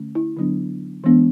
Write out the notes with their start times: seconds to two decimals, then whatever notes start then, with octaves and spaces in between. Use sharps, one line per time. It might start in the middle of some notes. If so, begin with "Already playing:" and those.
Already playing: D3 A3 C#4
0.15 E4
0.37 D3 F#3 B3 D4
1.04 E3 G#3 B3 D4